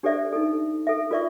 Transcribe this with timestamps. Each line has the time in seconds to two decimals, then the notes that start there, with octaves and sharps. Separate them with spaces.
0.03 D4 G4 A4 C5 D5 E5
0.33 D#4 G4 A4
0.87 A4 E5
1.11 F4 A#4 D5 E5 C#6